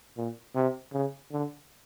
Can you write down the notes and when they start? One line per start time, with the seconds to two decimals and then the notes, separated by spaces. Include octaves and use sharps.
0.17 A#2
0.55 C3
0.93 C#3
1.32 D3